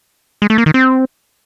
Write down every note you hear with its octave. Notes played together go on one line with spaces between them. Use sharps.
G#3
A3
A#3
D#3
C4